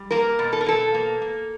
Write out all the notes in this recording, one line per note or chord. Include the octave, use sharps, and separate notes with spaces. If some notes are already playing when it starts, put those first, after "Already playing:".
Already playing: G3
A#3 A#4
B2
A4
A#4
B2 A4
A#3
A#3